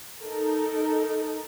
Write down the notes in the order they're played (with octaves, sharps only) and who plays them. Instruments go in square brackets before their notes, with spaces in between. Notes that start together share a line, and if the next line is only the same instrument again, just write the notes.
[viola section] D#4 A4 A#4